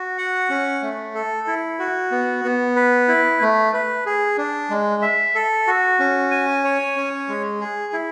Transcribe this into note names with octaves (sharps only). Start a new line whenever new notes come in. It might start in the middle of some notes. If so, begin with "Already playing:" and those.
Already playing: F#4
F#5
C#4
A3
A4
E4
F#4
B3
B3
B4
E4
A3
B4
G#4
D4
G#3
E5
A4
F#4
C#4
G#5
C#5
C#4
G#3
G#4
E4